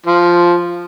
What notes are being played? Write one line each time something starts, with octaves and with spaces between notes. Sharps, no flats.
F3